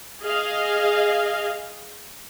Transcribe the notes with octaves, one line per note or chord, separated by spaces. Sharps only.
G#4 D#5 F5